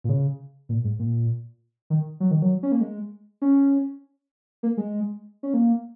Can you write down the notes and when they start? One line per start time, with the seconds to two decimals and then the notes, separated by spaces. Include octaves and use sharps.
0.04 A#2
0.09 C#3
0.69 A#2
0.84 G#2
0.99 A#2
1.90 D#3
2.20 F#3
2.31 D#3
2.42 F#3
2.63 C#4
2.72 A#3
2.81 G#3
3.42 C#4
4.63 A#3
4.77 G#3
5.43 C#4
5.54 A#3